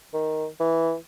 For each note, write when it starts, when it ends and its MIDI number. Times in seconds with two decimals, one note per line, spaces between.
0.14 0.47 51
0.60 0.95 52